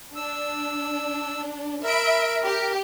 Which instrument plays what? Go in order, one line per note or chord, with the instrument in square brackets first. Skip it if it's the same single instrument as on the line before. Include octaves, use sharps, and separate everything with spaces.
[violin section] D4 [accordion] E6
[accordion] A#4 [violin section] E5 B5 D7
[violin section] G4